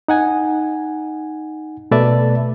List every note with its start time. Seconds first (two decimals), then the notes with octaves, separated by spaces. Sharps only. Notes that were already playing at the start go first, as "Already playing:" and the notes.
0.08 D#4 F#5 G#5
1.91 B2 A3 B4 D5 E5 A5